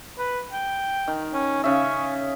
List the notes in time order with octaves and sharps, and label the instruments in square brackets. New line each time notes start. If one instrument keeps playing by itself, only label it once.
[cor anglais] B4
G5
[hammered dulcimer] D#3
[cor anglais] C#4
[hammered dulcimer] C#3 E5 [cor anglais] C#4